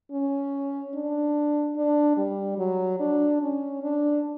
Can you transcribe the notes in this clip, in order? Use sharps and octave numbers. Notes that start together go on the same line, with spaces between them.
C#4
D4
D4
G3
F#3
D4
C#4
D4